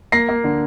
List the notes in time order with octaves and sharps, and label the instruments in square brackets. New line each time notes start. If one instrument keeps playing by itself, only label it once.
[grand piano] A#3 A#6 C7
A#3
D3